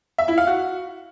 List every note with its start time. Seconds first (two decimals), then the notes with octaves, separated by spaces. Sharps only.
0.18 E5
0.28 E4
0.38 F5
0.47 F#4